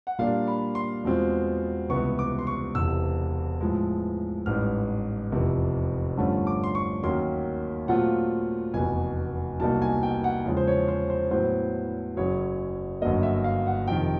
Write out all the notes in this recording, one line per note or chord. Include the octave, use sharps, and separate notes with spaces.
F#5
A#2 G3 A#3 D4 F5
B5
C6
E2 B2 G#3 C4 F4
C#2 C3 E3 G3 B3 C#6
D6
C6
C#6
E1 E2 C3 E6
A2 F3 G#3
A1 G#2 E3 G3 F6
F1 E2 C3 F3
G2 D3 F3 A3 C#4
D6
C6
C#6
D#2 D#3 F#3 A#3 C#4 C6
A#2 F#3 A3 C4 F4 F#5
F1 E2 B2 G#5
C2 B2 F#3 A#3 D#4 A5
G#5
G5
F#5
E2 C#3 F3 G#3
C5
C#5
C5
C5
A2 F#3 B3 C5
F#1 F#2 C#3 F#3 C#5
G1 F#2 D3 F#3 A#3 D#5
E5
F5
F#5
F2 C3 D#3 G5